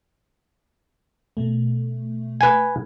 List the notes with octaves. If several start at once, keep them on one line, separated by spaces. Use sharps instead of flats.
B2 A3
B4 G#5